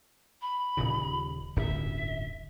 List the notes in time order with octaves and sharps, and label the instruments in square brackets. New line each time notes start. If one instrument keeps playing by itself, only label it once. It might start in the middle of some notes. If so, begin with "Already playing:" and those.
[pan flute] B5
[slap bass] D#1 A#2 C#3
[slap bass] D1 G1 F#2 [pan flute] E5